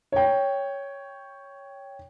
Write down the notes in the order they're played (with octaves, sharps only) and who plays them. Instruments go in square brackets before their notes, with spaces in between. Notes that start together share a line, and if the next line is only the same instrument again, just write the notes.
[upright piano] C#5 G5